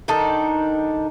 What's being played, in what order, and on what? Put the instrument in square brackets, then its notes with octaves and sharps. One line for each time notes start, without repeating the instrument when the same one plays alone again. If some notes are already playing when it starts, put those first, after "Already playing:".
[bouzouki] D#3 D4 D#4 A4